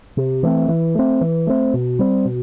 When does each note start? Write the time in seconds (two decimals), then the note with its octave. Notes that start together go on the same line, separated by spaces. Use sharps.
0.17 C3
0.43 E3 A3 C4
0.69 E3
0.95 A3 C4
1.21 E3
1.47 A3 C4
1.74 B2
1.99 G3 C4
2.25 B2